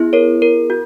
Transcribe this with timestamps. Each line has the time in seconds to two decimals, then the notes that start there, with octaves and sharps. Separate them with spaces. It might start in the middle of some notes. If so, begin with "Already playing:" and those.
Already playing: B3 E4 G#4
0.13 A#4 C#5
0.42 A#4
0.70 F#4